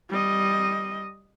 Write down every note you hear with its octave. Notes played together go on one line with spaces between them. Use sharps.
G3 D#5